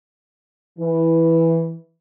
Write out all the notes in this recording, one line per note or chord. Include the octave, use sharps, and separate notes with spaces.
E3